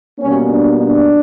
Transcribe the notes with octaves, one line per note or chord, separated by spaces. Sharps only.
B2 G3 A#3 C#4
D4
D4